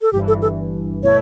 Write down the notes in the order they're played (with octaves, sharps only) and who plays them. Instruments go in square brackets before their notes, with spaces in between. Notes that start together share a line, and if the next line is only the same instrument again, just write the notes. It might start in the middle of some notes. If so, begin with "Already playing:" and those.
[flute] A4
[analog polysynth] G1 G2 E3 [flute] G4
[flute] A4
A4
[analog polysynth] B2 A3 E4 [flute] C#5